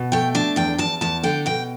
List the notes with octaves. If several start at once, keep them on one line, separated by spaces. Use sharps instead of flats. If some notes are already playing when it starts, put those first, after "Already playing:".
Already playing: B2
A3 G5
D4 A5
E2 G5
E2 A5
E2 A5
D3 G5
B2 G5